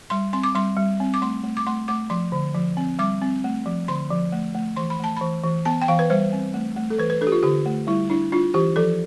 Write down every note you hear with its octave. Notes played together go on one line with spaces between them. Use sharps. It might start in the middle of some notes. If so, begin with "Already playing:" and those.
G3 C6
C4 C6
D6
G3 C6
G3
C4
D6
A3 C6
A3
D6
A3 C6
A3 D6
F3 C6
D3
F3
C4
G3 D6
C4
A3
F3
D3 C6
F3
A3
A3
E3 C6
B5
A3 A5
E3 B5
E3
B3 A5
G5
E3 F5
B4
G3 C5
C4
A3
A3
A4
E3 B4
B4
D4 A4
G4
F4
D3 G4
A3
G3 E4
D4 E4
D4 F4
E3 G4
F3 A4